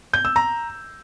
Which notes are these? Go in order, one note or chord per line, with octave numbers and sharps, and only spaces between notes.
G6
E6
A#5